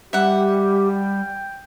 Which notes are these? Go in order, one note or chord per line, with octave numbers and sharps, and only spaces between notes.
G3 G4 E5 F#5
G5